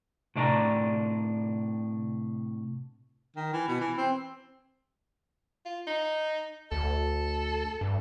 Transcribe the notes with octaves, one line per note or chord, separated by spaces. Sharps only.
A2 C3 D4 D5 G#5 A#5
D#3
E3
B2
E3
C4
F4
D#4
D2 A4
G2